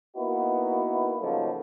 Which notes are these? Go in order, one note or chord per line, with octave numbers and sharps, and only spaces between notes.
A#3 B3 D#4 E4 F#4 B4
C#3 F3 F#3 A3 A#3 D#4